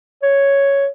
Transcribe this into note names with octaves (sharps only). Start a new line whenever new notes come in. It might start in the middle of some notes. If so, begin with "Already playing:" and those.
C#5